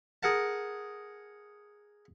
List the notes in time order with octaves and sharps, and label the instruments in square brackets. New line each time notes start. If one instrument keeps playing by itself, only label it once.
[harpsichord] G#4 A#4 F#5 A5